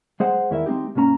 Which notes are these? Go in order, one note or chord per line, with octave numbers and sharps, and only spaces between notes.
G#3 G#4 C5 F#5
E2 D#3 E4 A#4 E5
G#3 C4 D#4 G4
B1 G2 A#3 C#4 A#5